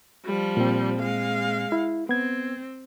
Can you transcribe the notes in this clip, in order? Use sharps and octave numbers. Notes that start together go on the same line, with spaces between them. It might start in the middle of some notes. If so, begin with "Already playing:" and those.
F3 G3
A#2 C4
G#3 F5
E4
B3 C4 G#6